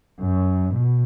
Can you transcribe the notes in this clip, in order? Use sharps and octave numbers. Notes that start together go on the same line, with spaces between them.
F#2
B2